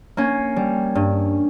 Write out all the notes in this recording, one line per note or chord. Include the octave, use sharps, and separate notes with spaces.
A#3 C#4
G3
G2